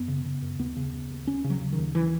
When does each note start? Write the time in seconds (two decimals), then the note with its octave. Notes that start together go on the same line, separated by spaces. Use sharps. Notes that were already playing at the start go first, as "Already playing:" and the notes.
Already playing: F#2 B3
0.08 C#3
0.25 C#3
0.42 F#2
0.59 D#2 B3
0.76 C#3
0.93 C#3
1.11 D#2
1.27 D#2 C#4
1.44 C#3
1.50 F#3
1.61 C#3
1.73 D#3
1.78 D#2
1.95 E3